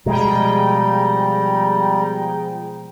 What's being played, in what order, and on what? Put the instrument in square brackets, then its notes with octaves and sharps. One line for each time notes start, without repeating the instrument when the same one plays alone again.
[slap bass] B2 G#3 [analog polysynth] F3 G#4 G5 [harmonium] G3 [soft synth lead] A#5